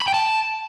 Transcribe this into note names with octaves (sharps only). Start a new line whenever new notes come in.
B5
G5
A5